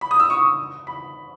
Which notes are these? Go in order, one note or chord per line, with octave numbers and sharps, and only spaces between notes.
B5
D#6
E6
C#6
B5